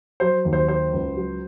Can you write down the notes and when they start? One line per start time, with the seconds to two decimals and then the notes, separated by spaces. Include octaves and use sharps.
0.20 F#3 C5
0.45 D#2
0.53 C5
0.68 F#3 C5
0.93 C#2
1.17 F#3